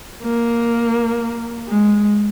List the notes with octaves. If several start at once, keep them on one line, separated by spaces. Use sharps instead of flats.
A#3
G#3